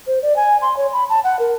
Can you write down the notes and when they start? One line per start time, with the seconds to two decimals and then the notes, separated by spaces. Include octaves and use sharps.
0.07 C5
0.22 D5
0.36 G#5
0.62 C6
0.77 C#5
0.93 B5
1.10 A5
1.24 F#5
1.39 A#4